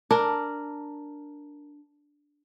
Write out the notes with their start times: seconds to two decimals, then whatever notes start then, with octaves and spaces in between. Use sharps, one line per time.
0.11 D4 A#4